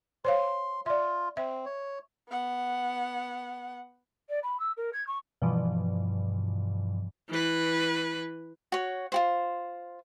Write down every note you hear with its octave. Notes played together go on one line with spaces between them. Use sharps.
C5 C#5 F5 C6
F4 D5 E5
C4 E5
C#5
B3 F#5
D5
B5
E6
A#4
G#6
C#6
G2 B2 E3 F3
E3 B4
F#4 C#5
F4 F#4 C5